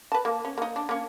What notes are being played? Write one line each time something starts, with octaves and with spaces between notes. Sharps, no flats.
B4 A5
A#3
C#4
A#3 D#4
D4
A#3 C#4